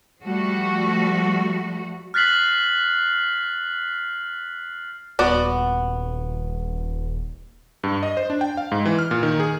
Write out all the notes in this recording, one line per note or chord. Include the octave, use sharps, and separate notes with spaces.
F3 G3 A3 F#4
F6 F#6 A6 B6 C7 F#7
D#1 B3 F#4 D5
G2
D#5
C5
D4
G5
F5
G#2
E3
F6
A#2
D#3
G#4